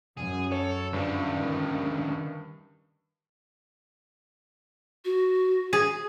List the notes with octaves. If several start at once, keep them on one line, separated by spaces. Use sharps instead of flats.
F#2 G#4
A4 C#5
D2 G2 C#3
D#3
F#4
G#4